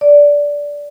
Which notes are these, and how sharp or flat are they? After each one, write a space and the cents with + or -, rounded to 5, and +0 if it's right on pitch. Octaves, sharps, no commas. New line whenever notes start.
D5 -15